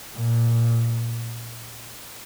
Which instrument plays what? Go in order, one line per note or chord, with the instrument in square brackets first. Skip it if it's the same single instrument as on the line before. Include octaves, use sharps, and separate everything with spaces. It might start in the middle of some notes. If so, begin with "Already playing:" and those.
[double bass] A#2